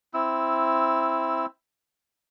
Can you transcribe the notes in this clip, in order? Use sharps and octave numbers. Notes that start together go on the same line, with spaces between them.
C4 E4 E6